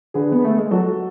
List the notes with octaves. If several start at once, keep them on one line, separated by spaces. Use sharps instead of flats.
D3 G#4 B4
B3
A3
G#3
F#3 F#4 A4